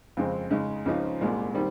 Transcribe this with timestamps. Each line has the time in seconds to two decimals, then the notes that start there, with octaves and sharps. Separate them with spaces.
0.17 F2 C#3 G#3 C4
0.51 C#3 G#3 D#4
0.86 C#2 C#3 F3 C4 D#4
1.21 C2 A#2 G#3
1.55 D#3 G3 C4